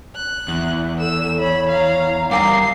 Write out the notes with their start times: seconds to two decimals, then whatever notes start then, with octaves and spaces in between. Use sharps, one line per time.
0.16 F#6
0.48 E2
1.00 A4 E6 E7
1.39 C#5 B5
1.70 F5 A#5
2.31 G3 A#4 F5 G5 A#5 D6 C7